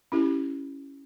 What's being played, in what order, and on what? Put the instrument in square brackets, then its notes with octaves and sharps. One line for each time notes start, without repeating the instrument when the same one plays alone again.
[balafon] C#4 E4 G4